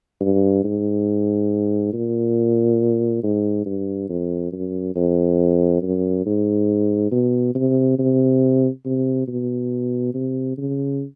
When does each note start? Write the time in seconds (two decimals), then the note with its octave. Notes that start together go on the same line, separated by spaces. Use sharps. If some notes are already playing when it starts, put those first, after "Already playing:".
0.21 G2
0.64 G#2
1.93 A#2
3.23 G#2
3.66 G2
4.09 F2
4.52 F#2
4.95 F2
5.82 F#2
6.26 G#2
7.11 B2
7.55 C3
7.99 C3
8.85 C3
9.28 B2
10.14 C3
10.58 C#3